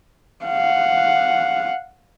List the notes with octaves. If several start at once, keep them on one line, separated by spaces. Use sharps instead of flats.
F5 F#5